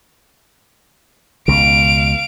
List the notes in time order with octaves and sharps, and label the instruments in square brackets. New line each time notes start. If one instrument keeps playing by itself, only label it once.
[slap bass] C#2 B2 [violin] F5 D7